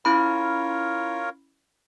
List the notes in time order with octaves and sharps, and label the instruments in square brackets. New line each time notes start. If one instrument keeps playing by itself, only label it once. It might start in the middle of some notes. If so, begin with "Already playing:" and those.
[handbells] C#4 E4 B5 [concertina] F4 A#4 C#5